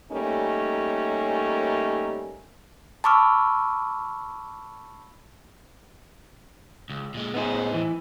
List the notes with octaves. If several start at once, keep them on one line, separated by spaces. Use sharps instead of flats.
G3 A3 A#3 C#4 D#4
A5 B5 C#6 D6 E6 F6
C#2
A#2 G#3
A2 B3 D#4 G#4 C5
E3